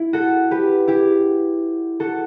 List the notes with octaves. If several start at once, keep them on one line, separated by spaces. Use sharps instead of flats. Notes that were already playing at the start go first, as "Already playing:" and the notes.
Already playing: E4
F#4 A4
G4 B4
E4 G4
F#4 A4